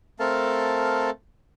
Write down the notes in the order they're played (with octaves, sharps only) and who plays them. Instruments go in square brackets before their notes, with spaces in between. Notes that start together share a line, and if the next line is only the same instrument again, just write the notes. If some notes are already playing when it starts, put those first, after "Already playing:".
[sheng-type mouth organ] A3 C4 A4 A#4 F5 A5